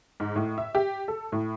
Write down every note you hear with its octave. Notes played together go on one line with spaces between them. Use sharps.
G#2
A2
E5
G4
A4
A2